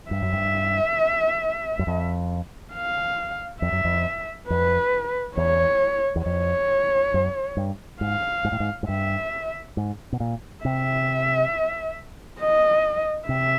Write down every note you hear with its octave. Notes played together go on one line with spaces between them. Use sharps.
G2 E5
F#2
G2
F#2
F2
F5
F2 E5
F#2
F2
F2 B4
E2 C#5
E2
F2 C#5
F#2
G2
G#2 F5
G#2
A2
G#2
G#2
G2 E5
G#2
B2
A#2
C3 E5
D#5
C3 E5